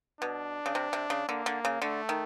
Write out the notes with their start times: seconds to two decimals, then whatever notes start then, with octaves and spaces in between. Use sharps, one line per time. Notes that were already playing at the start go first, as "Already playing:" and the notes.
0.21 B2 D4
0.66 C#3
0.75 C3
0.93 C3
1.10 C#3
1.29 D3 A#3
1.46 D3
1.65 C#3
1.82 D3 A3
2.09 D#3